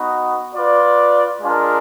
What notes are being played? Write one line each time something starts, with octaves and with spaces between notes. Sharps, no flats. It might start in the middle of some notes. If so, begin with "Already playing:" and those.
Already playing: B3 D#4 F#4 B4
F4 B4 D5
G#3 D4 F4 A#4